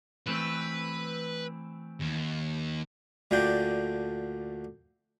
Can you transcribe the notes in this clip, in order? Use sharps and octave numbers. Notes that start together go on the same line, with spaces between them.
E3 A3 C4 B4
D#2
D2 A#2 D3 D4 G5